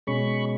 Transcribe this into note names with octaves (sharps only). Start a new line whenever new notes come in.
B2 G#3 C#4 B5 C#6